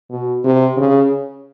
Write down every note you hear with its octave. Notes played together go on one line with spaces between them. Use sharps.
B2
C3
C#3